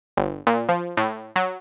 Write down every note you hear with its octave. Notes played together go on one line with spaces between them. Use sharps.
G1
A#2
F3
A2
F#3